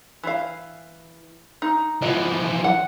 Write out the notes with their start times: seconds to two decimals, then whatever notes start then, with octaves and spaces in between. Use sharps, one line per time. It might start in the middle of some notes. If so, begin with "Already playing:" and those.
0.23 E3 F5
1.62 D#4
2.02 E3 F3 B3 D#5
2.64 F#5